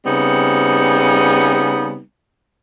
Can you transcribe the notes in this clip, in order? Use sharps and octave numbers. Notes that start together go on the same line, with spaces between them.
C#3 G3 B3 C4 D#4